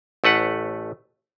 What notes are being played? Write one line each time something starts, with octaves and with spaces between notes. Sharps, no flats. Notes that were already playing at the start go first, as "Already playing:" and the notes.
A1 A3 B4 F#5